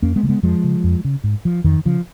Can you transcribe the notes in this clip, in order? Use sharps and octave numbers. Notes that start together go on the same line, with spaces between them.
F2 A#3 C#4
G#3 B3
C#3 A#3
G#3 B3
F2 F3 G#3
C#3
F2
C#3
G#2
F3
F2 D#3
C#3 F3